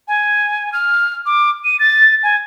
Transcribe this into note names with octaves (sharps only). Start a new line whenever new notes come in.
G#5
F6
D6
D#7
A6
G#5